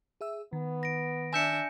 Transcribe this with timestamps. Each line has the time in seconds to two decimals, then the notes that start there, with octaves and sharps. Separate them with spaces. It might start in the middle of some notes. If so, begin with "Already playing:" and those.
0.21 G#4 E5 E6
0.53 D#3 B3
0.83 A#6 D7
1.33 D4 E5 G#5 G6 C#7